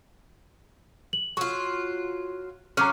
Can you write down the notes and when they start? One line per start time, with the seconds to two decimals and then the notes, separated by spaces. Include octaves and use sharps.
1.13 F#7
1.37 F#3 F4 C#6
2.77 F#3 C#4 F5 A#5 D6 F6